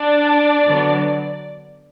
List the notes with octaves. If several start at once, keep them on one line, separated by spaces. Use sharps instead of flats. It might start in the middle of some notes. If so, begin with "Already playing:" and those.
Already playing: D4 D5
D3 F#3 B3 D4